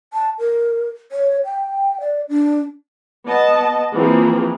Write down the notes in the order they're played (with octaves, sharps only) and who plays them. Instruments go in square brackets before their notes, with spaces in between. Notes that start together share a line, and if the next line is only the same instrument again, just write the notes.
[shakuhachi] A5
A#4
C#5
G5
D5
D4
[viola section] B3 D#5 A5
E3 F3 A#3 C4 G#4